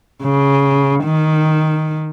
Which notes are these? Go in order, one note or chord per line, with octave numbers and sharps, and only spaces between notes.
C#3
D#3